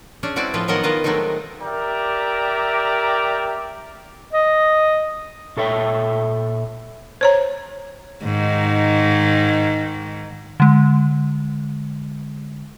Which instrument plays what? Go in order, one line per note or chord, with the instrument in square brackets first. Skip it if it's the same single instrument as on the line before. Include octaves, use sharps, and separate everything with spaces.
[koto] C#4 D4 G#4
G#3 C4 E4 F#4 B4 D5
A2 F3 F4 B4
D#3 F#3 B3 A#4 D#5 F#5
D#3 F4 B4 D#5
D#3 F#3 G#3 A3 C4 D#4
[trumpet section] G4 A#4 D5 E5 G5 A#5
[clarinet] D#5
[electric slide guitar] A#2 A4 C#5 E5 G5
[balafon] C5 C#5 A#5
[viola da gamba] G#2 D#3
[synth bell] D3 G#3